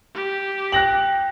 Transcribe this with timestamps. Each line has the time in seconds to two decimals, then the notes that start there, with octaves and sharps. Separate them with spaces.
0.15 G4
0.72 G5 F#6 A#6 F#7